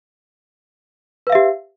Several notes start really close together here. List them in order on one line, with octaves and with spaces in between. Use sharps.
B4 F5 E5 G4